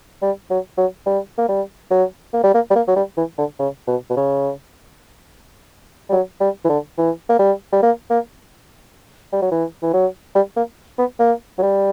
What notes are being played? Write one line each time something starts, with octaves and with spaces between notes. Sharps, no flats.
G3
F#3
F#3
G3
A#3
G3
F#3
A#3
G3
A#3
G3
A#3
F#3
G3
E3
D3
C#3
B2
B2
C#3
G3
F#3
G3
E3
D3
E3
A#3
G3
G3
A#3
A#3
G3
F#3
E3
E3
F#3
G3
A#3
B3
A#3
F#3
G3